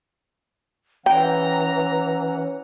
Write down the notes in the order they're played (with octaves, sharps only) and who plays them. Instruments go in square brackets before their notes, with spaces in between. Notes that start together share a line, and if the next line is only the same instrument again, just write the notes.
[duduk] E3 [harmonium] C#4 F#5 [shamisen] G5 [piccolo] A#5